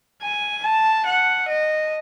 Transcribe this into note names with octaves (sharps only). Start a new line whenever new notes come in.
G#5
A5
F#5
D#5